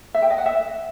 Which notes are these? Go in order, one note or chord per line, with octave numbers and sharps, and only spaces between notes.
E5
G5
D#5
F#5
E5